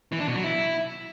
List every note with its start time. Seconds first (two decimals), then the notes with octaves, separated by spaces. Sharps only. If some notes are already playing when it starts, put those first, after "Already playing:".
0.12 E3
0.20 D4
0.28 B2
0.36 F#3
0.44 E4